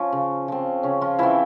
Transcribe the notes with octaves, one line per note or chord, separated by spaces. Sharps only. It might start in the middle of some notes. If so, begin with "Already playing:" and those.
Already playing: F3 C#4
C#3
F3 C4
C#3 C#4
F3 F4
E3 F3 C4 E4